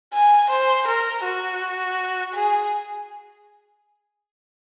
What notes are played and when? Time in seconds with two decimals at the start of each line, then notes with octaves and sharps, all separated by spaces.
0.13 G#5
0.49 C5
0.87 A#4
1.24 F#4
2.33 G#4